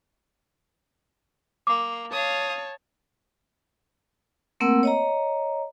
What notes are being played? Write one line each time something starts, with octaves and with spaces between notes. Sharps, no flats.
A#3 D6
C#5 F5 A5 D#6
A3 A#3 C4 A#4 F#5 E6
C#5 D#5 A#5